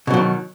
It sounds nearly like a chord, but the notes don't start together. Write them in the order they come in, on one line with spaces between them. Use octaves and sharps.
B2 F#3 D3 D#3